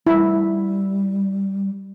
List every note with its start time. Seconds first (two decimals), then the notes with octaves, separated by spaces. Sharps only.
0.07 G3 E4